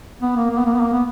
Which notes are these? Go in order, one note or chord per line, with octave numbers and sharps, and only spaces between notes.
B3
A#3
A#3
B3
A#3
B3
A#3
B3